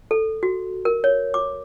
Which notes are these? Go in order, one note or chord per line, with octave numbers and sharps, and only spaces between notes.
A4
F#4
A#4
C#5
D6